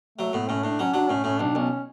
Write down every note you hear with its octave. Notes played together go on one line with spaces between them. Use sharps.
F#3 A3
A2 B3
A2 C#4
A2 D4
F#3 C#4
F#3 D4
A2 C#4
A2 C#4
B1 D4
B1 C#4